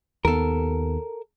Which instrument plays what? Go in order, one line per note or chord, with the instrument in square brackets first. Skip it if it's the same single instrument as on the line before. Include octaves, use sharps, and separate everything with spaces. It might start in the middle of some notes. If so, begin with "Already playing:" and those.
[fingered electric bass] D#2 B3 [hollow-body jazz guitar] A4 A#4